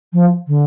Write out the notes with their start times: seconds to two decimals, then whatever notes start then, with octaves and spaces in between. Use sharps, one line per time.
0.12 F3
0.47 D3